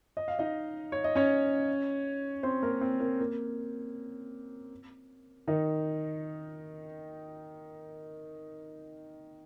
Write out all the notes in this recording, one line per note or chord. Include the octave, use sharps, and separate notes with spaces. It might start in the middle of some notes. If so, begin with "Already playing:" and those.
D#5
F5
D#4 D#5
C#5
D#5
C#4 C#5
C4 C5
A#3 A#4
C4
A#3
A#3
D#3 D#4